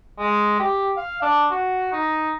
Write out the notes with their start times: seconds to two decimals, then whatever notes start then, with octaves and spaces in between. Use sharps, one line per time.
0.19 G#3
0.59 G4
0.97 F5
1.22 D4
1.51 F#4
1.93 D#4